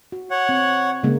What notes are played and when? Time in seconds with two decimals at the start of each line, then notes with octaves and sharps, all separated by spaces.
0.12 F#4
0.31 C#5 F#5
0.49 C4
1.03 C#3 G#3 A#3